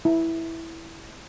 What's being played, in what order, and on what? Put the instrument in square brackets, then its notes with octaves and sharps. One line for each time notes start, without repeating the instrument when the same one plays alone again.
[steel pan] E4